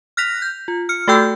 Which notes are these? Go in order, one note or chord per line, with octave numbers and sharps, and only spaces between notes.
F6 F#6 A#6 B6 F7
G6
F4
F6 C#7
A3 F#4 A4 G5 E6 G6